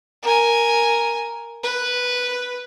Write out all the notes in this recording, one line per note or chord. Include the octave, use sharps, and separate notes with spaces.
A#4 G#5
B4